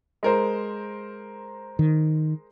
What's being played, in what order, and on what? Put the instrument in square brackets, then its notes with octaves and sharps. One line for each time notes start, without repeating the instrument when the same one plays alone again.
[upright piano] G#3 A#4 C5
[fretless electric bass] D#3